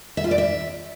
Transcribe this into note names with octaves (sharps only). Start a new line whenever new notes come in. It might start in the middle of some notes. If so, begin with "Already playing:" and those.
E5
F4
D5
E5